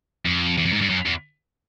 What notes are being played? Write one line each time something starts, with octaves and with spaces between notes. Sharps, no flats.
F2
E2
F2
G#2
G2
F#2
E2